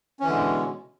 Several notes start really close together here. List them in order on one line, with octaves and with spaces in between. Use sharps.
C#4 E3 D3 G#3 B2